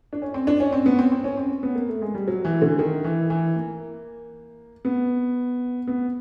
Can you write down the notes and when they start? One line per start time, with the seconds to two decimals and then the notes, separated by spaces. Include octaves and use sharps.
0.13 D4
0.22 C#4
0.34 C4
0.47 D4
0.60 C#4
0.73 C4
0.86 B3
0.99 C4
1.12 C4
1.24 C#4
1.37 C4
1.63 B3
1.75 A#3
1.89 A3
2.02 G#3
2.15 G3
2.28 F#3
2.45 E3
2.62 D3
2.79 D#3
3.04 E3
3.30 E3
3.56 A#3
4.85 B3
5.87 B3